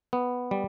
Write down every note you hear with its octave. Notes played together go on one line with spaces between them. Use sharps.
B3
G3